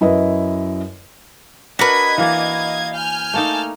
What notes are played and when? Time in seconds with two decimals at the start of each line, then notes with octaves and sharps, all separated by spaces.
0.01 F#2 E4 B4 D#5
1.79 D4 F#4 A#4 B4 D#5 G#6 B6
2.18 E3 A#3 D5 F5
2.93 G#5 F6 G6
3.34 A3 A#3 D#4 A5